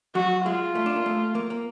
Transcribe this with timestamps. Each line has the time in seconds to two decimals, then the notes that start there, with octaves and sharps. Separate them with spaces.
0.15 F#3 F#4
0.45 G#3 F4
0.75 A3
0.86 D4
0.96 A#3
1.06 A3
1.35 A#3
1.50 A#3